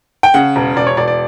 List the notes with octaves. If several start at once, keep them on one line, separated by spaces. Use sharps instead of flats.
G5
C#3 F#5
E1
E1 D5
C#5
E1 D5
D5